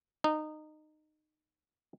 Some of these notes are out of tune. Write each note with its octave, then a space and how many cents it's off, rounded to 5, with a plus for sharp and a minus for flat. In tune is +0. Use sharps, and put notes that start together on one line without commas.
D#4 -20